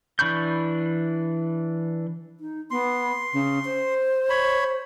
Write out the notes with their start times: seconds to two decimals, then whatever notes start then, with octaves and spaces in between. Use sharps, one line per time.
0.19 E3 D4 B5 C#6 G6
2.40 D#4
2.71 B3 C6
3.34 C#3
3.65 C5
4.30 C#5 B5